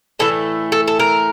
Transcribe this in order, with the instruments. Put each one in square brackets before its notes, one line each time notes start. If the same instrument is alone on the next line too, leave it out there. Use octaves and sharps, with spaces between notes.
[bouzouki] A2 E3 A3 A4
A4
A4
A#4